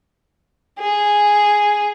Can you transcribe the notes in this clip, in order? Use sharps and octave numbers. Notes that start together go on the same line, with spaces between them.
G#4